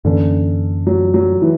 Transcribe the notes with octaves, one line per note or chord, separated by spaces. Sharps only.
F#2 D3 E3 A#3 C#4
F#3
F#3
E3